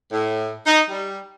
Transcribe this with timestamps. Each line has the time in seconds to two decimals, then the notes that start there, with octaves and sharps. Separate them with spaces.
0.12 A2
0.66 D#4
0.90 G3